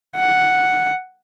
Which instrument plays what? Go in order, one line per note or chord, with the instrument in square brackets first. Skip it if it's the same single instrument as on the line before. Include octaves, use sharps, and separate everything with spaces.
[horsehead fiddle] F#5